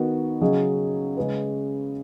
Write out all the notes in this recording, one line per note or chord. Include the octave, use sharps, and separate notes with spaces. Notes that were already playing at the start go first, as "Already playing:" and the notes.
Already playing: D#3 B3 F#4
C#3 F#3 C#4 G#4 D#5
C#3 G#3 C#4 G#4 B4